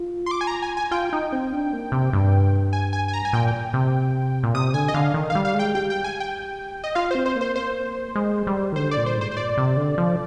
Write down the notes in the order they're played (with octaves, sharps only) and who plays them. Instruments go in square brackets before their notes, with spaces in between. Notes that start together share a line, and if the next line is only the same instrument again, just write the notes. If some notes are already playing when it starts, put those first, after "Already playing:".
Already playing: [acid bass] F4
[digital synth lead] C6
D6
G#5
A#5
G#5
G#5
[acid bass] F4 [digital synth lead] G5
[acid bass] D#4
C4
D4
A#3
C3
G2
[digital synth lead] G#5
G#5
G#5
A#5
G#5
[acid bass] A#2 [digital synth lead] G5
[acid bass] C3
A#2
[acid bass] C3 [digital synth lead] D#6
[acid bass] D3 [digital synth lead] G#5
[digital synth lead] D#5
[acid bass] D3 [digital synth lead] F5
[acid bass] D#3
[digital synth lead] F5
[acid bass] G3
[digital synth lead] F5
[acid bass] G#3
[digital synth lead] G5
[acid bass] G4 [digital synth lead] G5
[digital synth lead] G5
G#5
G5
D#5
[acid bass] F4 [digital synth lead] F5
[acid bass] C4 [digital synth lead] C5
[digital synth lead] C5
[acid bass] A#3 [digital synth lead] C5
[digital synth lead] C5
[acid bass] G#3
G3
D#3
[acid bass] D3 [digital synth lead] C5
[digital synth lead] D5
[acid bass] A#2
[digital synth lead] C5
[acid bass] G#2 [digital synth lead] C5
[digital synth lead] C5
[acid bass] A#2 [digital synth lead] D5
[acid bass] C3
D3
F3